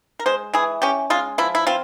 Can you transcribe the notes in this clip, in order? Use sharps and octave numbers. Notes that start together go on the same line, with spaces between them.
A#4
G#3 C5
E3 G#4
C#4 G4
G#3 F4
F3 E4
E4
C4 F4